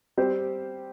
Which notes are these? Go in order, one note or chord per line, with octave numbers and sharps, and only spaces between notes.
G3 C4 G4 C5